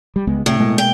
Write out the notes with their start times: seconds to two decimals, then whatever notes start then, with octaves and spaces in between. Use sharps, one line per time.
0.16 G3
0.27 C#2 G#3 B3
0.46 A2 C3
0.59 B2 G#3 A#3
0.78 G5